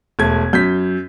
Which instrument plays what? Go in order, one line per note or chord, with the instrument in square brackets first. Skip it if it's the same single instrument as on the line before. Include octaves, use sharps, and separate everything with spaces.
[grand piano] E1 A3 G#6
[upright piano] F#2 [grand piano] G6 B6